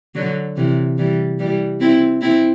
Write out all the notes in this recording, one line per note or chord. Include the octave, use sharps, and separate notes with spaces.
D3 F#3
C3 E3
E3 G3
E3 G3
C4 E4
C4 E4